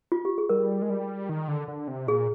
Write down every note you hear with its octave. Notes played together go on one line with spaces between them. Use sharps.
F4
G4
G#4
G3 A#4
G#3
G3
D#3
D3
D3
C3
A#2 G#4